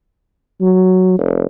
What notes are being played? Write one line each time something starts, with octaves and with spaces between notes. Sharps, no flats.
F#3
F1